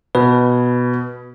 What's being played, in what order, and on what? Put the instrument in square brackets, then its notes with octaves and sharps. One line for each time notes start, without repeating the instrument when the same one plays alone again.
[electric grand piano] B2 [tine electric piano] B4